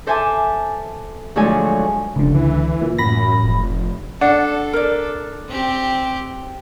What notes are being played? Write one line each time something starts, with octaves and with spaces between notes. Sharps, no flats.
A4 C5 E5 G#5 A5 D6
D2 F3 F#3 G#3 A4 G#5
F1 C#2 D3
E3
A#2
A1 F#2 B5 A#6
F1
D4 A4 F#5
A#4 D5
C4 G4